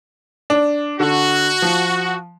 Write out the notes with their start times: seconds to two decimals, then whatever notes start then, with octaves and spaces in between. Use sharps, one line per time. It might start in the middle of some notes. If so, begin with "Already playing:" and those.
0.50 D4
1.00 D3 F#4
1.62 F3